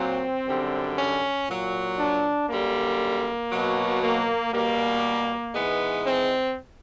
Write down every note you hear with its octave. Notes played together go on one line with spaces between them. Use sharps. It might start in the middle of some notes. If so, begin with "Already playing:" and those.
Already playing: A#2 F#3 C4
F#2 D3 G3
C#4
A#2 F#3
D4
F#2 D3 G3 A#3
B2 F#3
A#3
B2 G3 A#3
G#2 E3 G#3 B3
C4